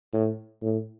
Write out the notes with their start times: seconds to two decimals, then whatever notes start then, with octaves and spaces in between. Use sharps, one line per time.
0.13 A2
0.62 A2